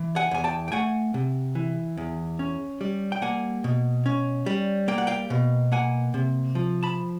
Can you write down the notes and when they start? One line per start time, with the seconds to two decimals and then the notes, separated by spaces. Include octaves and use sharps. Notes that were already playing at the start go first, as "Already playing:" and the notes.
Already playing: E3
0.16 F#5 G#5
0.31 E2 G#5
0.44 G5 A5
0.68 G5
0.72 A3 F#5 G#5
1.14 C3
1.55 E3
1.97 E2
2.39 C#4
2.81 G3
3.12 G5
3.22 A#3 F#5 G#5
3.64 B2
4.06 C#4
4.46 G3
4.88 A#3 G5
4.98 F#5
5.07 F5 G5
5.30 B2
5.72 A#3 F#5 G#5
6.14 C3
6.55 F3
6.83 A5 B5